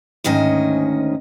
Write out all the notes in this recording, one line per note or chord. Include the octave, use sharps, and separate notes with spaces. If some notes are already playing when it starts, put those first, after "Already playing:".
D2 G#2 D#3 C#4 D#5